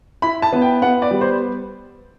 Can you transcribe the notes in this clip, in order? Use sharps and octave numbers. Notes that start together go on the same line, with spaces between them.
E4 B5
A5
B3
G5
B3 F#5
D5
G3
C5